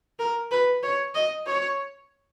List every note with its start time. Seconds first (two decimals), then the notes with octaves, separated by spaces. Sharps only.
0.19 A#4
0.51 B4
0.83 C#5
1.15 D#5
1.46 C#5